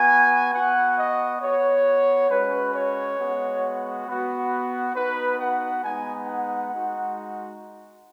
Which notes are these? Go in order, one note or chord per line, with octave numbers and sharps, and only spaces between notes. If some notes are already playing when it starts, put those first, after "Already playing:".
Already playing: B3 F#4 G#5
B3 F#4 F#5
D#5
B3 F#4 C#5
G#3 C#4 F#4 B4
C#5
G#3 B3 F#4
B3 F#4
B3 D#4 F#4 B4
F#5
G#3 B3 D#4 G#5
F#5
G#3 D#4 F#4